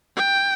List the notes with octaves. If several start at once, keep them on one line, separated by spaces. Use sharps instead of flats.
G5